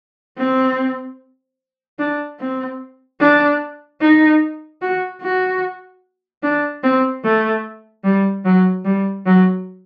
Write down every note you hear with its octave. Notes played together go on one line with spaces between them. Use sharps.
C4
D4
C4
D4
D#4
F#4
F#4
D4
C4
A3
G3
F#3
G3
F#3